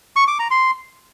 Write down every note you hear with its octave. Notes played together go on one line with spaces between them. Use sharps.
C#6
D6
A#5
C6